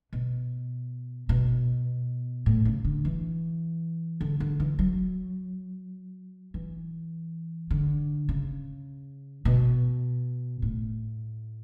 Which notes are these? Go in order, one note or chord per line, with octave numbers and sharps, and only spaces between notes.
B2
B2
A2
C#3
D3
E3
D3
D3
E3
F#3
E3
D3
C#3
B2
A2